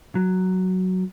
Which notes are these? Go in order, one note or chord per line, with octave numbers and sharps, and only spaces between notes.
F#3